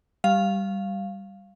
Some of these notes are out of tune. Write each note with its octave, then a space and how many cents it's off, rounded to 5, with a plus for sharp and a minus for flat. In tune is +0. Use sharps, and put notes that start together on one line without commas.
G3 +0 F5 +0